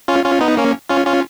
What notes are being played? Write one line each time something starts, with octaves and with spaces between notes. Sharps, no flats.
C#4 F4
C#4 F4
B3 D#4
A#3 C#4
C#4 F4
C#4 F4